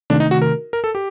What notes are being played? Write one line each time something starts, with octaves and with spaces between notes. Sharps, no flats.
C3 D#3 A3 D4
D#4
F#4
A#4
A#4
A4
G4